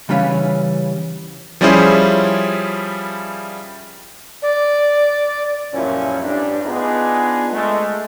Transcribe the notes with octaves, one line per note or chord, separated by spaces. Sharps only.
C#3 E3 G3 C#4 B4 F5
F3 G3 C#4 E4 G#4 C5
D5
A1 F#2 A#2 F3 C#4 E4
A1 G2 D4
B3 D4 D#4 F4 G#4
G#3 A3